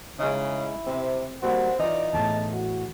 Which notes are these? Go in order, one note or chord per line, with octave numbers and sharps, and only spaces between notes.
C#3 G#3 D#4 E4
C3 C4
G3 A#3 C4 F#4 F#5
E3 D#4 F4 D5
E2 A2 A5
F#4